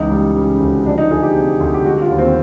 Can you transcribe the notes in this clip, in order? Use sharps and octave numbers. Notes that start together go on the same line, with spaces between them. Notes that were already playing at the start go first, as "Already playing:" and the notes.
Already playing: C#2 E3 D#4
G3
C#3
D2
F3 D4
D#4
D2 G#4
G4
C3
D2
G4
G3 F#4
F4
D#2
C4